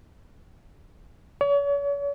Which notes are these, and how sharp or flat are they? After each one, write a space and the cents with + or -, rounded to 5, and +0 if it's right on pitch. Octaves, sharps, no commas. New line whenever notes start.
C#5 +40